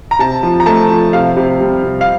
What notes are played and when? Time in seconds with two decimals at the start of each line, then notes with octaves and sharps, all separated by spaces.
0.11 A#5
0.19 C3 A5
0.43 F3
0.60 A#5
0.66 A3 A5
0.91 F3
1.13 C3 F5
1.36 C3
1.61 G3
1.83 C3
2.01 F5